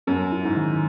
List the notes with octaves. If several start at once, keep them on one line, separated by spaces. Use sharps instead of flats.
F#2 C#4
E4
G#2
D#3